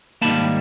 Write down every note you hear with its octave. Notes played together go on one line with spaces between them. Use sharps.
G#2 D#3 G3 A#3 A5 B5